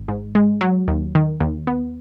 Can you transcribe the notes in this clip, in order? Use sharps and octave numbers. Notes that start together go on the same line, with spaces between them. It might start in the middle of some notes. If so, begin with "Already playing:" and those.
Already playing: G#1
G#2
G#3
F#3
D#2
D#3
D#2
B3